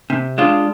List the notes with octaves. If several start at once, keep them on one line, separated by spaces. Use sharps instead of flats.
C3
G#3 D4 F4